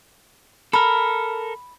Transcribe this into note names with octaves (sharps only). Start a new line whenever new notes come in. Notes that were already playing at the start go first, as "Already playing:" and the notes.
A4 A#4 B5